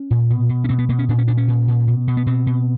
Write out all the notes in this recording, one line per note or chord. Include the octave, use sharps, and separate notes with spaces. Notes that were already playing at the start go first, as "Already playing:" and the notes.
Already playing: C#4
A#2
B2
B2
C#4
B2 C4
B3
B2 A#3
C#4
A#2 D4
C#4
A#2 D4
C#4
A#2
A#2
B2
B2
B3
B2 C4
B2